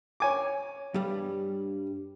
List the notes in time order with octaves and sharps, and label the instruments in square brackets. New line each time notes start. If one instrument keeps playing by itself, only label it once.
[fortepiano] C#5 G#5 D6
[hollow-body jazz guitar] G2 G3